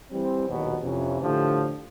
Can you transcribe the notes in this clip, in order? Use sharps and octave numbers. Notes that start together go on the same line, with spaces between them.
E3 G3 C4
A#1 D#2 B2 F#3
F2 C3 E3 F3 C#4
A2 D3 F3 G4